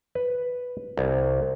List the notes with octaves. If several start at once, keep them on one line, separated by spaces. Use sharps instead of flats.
B4
C2